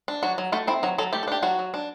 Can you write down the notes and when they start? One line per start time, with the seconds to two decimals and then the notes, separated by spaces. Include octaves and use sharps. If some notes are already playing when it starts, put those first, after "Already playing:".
0.08 D4
0.23 F#3 F#4
0.38 F#3
0.52 A3 F#4
0.67 C4 E4
0.83 F#3 F#4
0.98 F#3 A4
1.13 A3 G4
1.23 A4
1.28 D4 G4
1.43 F#3 F#4
1.59 F#3
1.74 D4